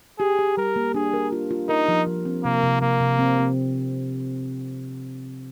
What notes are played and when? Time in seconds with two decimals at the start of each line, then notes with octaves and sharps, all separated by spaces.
0.19 G4 G#4
0.39 G4
0.57 G3 A#4
0.76 A#3
0.94 D4 G#4
1.13 A#4
1.32 F4
1.51 F4
1.69 D#4 A#4
1.88 F3
2.06 F3
2.25 C4
2.44 C3 A#3
2.63 C3
2.82 C3 A#3
3.00 C3
3.19 C4
3.38 C4